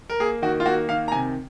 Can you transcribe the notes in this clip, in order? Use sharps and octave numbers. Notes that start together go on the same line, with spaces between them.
A#4
A#3 G#4
D#3 F#4
F4
A#3 F#4
D#3 F5
A#5
C3 G#5